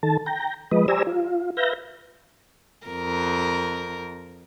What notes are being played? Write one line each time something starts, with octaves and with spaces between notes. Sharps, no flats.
D#3 A4 A5
G5 A#5
F3 G#3 B4 D#5
G4 C5 D5 G#5 A#5 E6
F4
B4 E5 F5 G6 A#6
F2 A#4